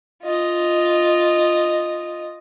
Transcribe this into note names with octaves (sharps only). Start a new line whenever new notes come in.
F4 D#5